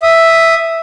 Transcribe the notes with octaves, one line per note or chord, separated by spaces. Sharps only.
E5 D#6